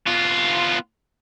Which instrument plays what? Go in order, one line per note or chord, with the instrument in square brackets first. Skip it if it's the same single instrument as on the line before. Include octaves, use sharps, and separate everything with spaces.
[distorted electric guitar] B3 F4